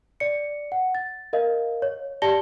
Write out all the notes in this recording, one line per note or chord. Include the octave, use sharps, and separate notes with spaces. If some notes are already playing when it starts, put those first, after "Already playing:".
D5 C#7
F#5
A6
A#4 D#5 F5
C#5
G4 D5 A5 A#6 C#7 G7